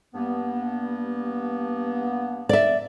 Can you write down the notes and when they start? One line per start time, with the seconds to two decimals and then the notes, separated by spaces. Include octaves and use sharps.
0.14 G2 A#3 B3
2.49 D5 E5